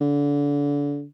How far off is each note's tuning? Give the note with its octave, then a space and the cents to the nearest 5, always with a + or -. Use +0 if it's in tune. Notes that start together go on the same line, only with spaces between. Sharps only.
D3 -30